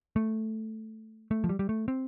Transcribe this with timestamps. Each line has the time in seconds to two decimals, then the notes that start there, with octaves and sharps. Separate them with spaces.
0.16 A3
1.31 A3
1.44 F3
1.49 G3
1.59 G3
1.69 A3
1.88 C4